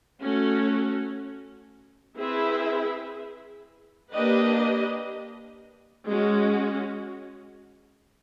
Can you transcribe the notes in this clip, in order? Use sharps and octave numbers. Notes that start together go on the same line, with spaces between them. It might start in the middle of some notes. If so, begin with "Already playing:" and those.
A3 C#4 F#4
C4 E4 G#4 B4 E5
A#3 D4 G4 B4 D#5
G#3 C#4 F#4